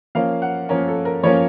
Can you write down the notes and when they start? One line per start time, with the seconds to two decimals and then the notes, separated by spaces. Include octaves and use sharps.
0.15 F3 A#3 C#4 F5
0.42 F#5
0.69 F3 A#3 C#4 A#4
0.88 A4
1.05 A#4
1.23 F3 A#3 C#4 C#5